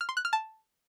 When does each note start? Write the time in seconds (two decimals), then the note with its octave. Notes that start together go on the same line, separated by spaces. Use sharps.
0.01 F6
0.09 C6
0.17 F#6
0.25 F6
0.33 A5